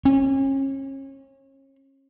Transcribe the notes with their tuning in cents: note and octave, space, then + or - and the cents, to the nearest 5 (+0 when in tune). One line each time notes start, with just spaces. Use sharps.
C#4 -35